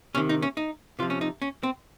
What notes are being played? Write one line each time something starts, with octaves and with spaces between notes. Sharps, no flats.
C3 D#3 C#4
D#4
C#4
D#4
C3 F3 F4
C#4
D#4
C#4
C4